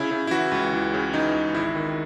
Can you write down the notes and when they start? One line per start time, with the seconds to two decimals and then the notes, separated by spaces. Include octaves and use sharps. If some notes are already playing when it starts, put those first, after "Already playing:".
Already playing: C#3 E4
0.11 C#3
0.27 E4
0.31 E3 F#4
0.52 C#2
0.73 E3
0.94 C#3
1.13 E3 D#4
1.35 C#2
1.54 G#1 E4
1.75 D#3